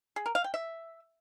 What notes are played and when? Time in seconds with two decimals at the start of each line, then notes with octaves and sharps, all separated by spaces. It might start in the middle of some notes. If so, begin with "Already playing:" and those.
0.16 G#4
0.26 A#4
0.35 F5
0.44 G5
0.54 E5